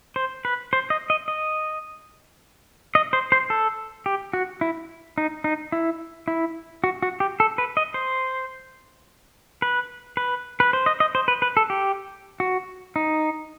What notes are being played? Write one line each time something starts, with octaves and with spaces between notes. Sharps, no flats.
C5
B4
C5
D#5
D#5
D#5
D#5
C5
C5
A4
G4
F#4
E4
D#4
D#4
E4
E4
F#4
F#4
G4
A4
B4
D#5
C5
B4
B4
B4
C5
D#5
D#5
C5
B4
B4
A4
G4
F#4
D#4